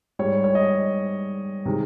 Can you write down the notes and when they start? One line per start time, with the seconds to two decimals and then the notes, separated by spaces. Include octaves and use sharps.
0.19 G#2 G3 C#5
0.44 C#5
0.55 D#5
1.65 C3 D#3 G#3